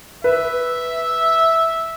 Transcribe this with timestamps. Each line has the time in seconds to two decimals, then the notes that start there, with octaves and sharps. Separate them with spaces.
0.24 B4 E5